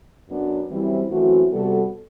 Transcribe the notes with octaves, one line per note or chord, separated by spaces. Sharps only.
F#2 F#3 B3 D4
F#2 E3 G3 C4 E4
F#2 E3 A3 C4 F#4
C3 G3 B3 F#4 A4